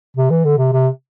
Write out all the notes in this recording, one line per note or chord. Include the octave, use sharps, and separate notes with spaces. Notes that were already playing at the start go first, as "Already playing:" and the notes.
C3
E3
D3
C3
C3